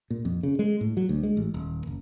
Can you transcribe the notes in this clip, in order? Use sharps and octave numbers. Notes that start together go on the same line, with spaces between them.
A#2
F2
C#3
G#3
A2
F#3
D2
G#3
A1
D#1
F#1